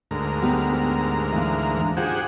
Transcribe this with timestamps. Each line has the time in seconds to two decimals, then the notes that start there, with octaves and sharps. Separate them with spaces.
0.11 D2 G#2 A#4
0.42 B3 G4 B4
1.32 E3 A#3
1.97 F4 G4 G#4 C5 F#5